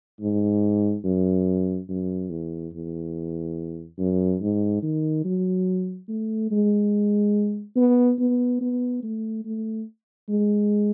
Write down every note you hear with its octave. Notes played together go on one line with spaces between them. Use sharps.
G#2
F#2
F#2
E2
E2
F#2
G#2
D#3
F#3
A3
G#3
B3
B3
B3
A3
A3
G#3